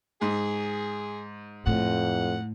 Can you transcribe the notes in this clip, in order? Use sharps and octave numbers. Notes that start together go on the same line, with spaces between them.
G#2 G#4
F2 A2 F#5